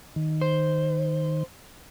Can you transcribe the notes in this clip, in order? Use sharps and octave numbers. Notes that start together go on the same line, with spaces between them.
D#3
C5